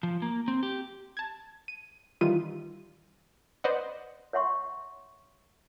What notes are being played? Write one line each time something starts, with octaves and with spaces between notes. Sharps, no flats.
F3
A#3
C4
G4
A5 G#6
D#7
D#3 E3 G3 F4 D#7
B4 C5 D5 D#5 F#5
C#5 E5 F#5 C6 C#6